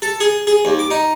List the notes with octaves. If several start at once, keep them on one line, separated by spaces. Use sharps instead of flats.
A4
G#4
G#4
D#2
D6
D#4